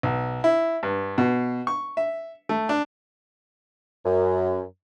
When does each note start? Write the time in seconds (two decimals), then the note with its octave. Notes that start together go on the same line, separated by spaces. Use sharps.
0.03 B1
0.44 E4
0.83 G2
1.18 B2
1.67 C#6
1.97 E5
2.49 A3
2.69 D4
4.06 F#2